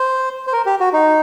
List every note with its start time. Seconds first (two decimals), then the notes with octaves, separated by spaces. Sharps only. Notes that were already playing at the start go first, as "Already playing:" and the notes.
Already playing: C5
0.47 C5
0.53 A#4
0.66 G4
0.80 F#4
0.93 D#4